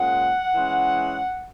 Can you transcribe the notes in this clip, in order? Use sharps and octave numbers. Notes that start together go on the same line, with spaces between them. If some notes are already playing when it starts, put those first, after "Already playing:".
Already playing: A#2 G#3 C#4 F#5
E3 G#3 C#4